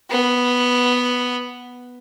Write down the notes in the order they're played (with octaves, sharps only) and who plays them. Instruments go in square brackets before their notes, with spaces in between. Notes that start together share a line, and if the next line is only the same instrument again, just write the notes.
[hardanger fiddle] B3